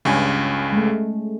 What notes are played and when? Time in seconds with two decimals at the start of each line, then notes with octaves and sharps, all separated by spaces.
0.05 C#2 G2 C#4 G#5
0.72 G#3 A3